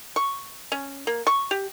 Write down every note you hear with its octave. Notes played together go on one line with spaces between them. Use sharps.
C#6
C#4
A#3
C#6
G4